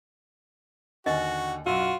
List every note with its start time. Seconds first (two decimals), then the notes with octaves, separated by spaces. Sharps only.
1.06 D#2 D3 F#4 D#5 G#5
1.66 B1 F#2 F4 F#4 E6